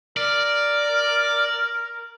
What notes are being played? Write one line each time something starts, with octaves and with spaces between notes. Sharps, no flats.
A#4 D5